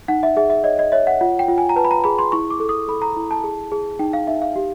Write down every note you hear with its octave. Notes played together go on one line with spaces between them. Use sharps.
D#4 F#5
E5
G#4 E5
E5
C#5 D#5
D#5
C#5 E5
F#5
F4 F#5
G5
F4
G#5
A#5
B4 A5
B5
A#5
G#4 B5
C6
E4 C#6
D6
A4
D#6
A4 B5
A#5
E4
A5
G#4
G#4
D#4 G5
F5
D#4 E5
F5
G4